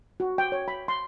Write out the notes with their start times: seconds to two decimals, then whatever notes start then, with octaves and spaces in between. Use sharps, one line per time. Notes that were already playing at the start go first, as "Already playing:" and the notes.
0.20 F#4
0.38 G5
0.52 C#5
0.68 B5
0.88 C6